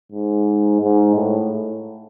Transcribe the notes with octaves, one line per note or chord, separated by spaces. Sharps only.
G#2
G#2
A2